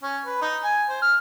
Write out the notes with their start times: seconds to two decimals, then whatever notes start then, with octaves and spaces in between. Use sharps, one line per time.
0.03 C#4
0.25 B4
0.42 D#4
0.64 G#5
0.89 C5
1.02 F6